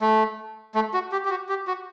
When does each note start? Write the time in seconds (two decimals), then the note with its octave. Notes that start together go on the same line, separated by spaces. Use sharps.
0.01 A3
0.75 A3
0.94 F#4
1.12 G4
1.25 G4
1.30 F#4
1.49 G4
1.67 F#4